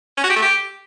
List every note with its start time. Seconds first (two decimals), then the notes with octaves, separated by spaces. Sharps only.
0.17 C#4
0.24 F#4
0.30 G4
0.36 A3
0.42 G4